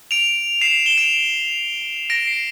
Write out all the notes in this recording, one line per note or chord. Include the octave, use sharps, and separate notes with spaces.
D7 F7
C7 E7
E7 G7
D7 F7
A#6 D7
C7